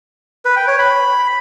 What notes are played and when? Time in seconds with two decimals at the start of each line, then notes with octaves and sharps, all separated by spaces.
0.45 B4
0.56 G5
0.68 C#5
0.79 B5